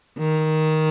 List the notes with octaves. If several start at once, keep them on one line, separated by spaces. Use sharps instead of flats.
D#3